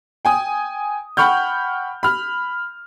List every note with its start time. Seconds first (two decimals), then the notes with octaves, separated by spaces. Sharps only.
0.25 G5 G#5 D#6
1.17 F#5 G5 B5 C#6 F6 G6
2.03 B5 F6